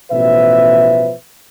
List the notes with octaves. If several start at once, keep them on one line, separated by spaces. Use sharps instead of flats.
A1 B2 F3 B4 E5